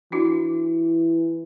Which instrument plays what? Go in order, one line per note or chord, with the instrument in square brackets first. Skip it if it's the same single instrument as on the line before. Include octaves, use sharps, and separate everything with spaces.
[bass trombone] E3 [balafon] D4 E4 F#4